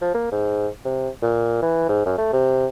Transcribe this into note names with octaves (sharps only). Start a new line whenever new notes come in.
F3
A#3
G#2
C3
A#2
E3
G#2
F#2
A3
C3